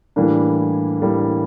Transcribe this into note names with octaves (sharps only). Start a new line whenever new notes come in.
A2 E3 G3 A#3 D4
A2 E3 G3 A#3 D4